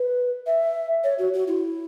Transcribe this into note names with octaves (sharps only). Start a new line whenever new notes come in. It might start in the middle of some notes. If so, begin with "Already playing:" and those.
Already playing: B4
E5
C#5
F#4
F#4
E4